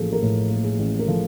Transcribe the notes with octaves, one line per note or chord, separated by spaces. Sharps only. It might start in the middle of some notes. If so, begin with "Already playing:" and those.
Already playing: A1 F3 A#3 G#4 A4
A#4
A2 A4
A#3
G#4
A1
A#4
F3 A4